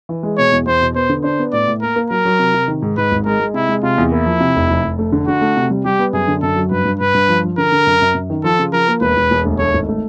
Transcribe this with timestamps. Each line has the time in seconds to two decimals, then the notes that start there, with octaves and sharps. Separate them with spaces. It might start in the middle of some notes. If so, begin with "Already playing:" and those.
0.09 E3
0.23 G#3
0.38 B2 C#5
0.52 E2
0.66 E2 C5
0.81 B2
0.95 B3 C5
1.09 D3
1.24 D4 C5
1.39 B3
1.52 A2 D5
1.68 A2
1.82 A#3 A#4
1.96 A#3
2.10 F#3 A#4
2.25 F#3
2.39 C3
2.54 C3
2.68 D#3
2.82 G#2
2.97 G#2 B4
3.12 G#1
3.26 G#3 A#4
3.40 G#3
3.54 C3 E4
3.69 G#3
3.83 C3 F4
3.98 E2
4.12 A#3 E4
4.26 F3
4.40 C3
4.56 F1
4.70 F1
4.84 F1
4.99 A3
5.12 D3
5.27 D3 F#4
5.41 A3
5.57 C3
5.70 G3
5.85 G3 G4
5.99 B3
6.13 F#2 G#4
6.28 D3
6.42 F#2 A4
6.56 F#3
6.71 G2 B4
6.85 G2
7.00 G2 B4
7.14 G2
7.29 F3
7.43 F3
7.58 D3 A#4
7.72 D3
7.87 F#2
8.02 F#2
8.15 F#2
8.30 D#3
8.44 F3 A4
8.59 C#3
8.73 F3 A#4
8.88 A#3
9.01 E1 B4
9.17 E1
9.31 E1
9.45 D2
9.59 A3 C#5
9.74 G#1
9.89 A3